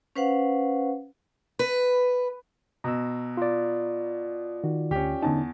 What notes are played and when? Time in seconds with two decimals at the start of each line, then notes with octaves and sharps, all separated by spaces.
0.16 C#4 B4 C5 F5 F#5
1.59 B4
2.84 B2 A#5 E6
3.37 F4 D5
4.64 D#3 F#4
4.91 D2 C#4 G4
5.23 E2 D3 C#4 D#4 A5